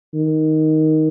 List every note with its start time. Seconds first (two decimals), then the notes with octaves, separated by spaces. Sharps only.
0.14 D#3